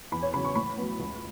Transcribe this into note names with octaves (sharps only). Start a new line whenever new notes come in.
E2 B5
C#5
C#3 F#3 B5
C#6
A2 B5
F#3 B3
C#2